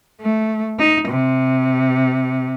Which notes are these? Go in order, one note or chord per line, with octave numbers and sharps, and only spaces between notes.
A3
D#4
C3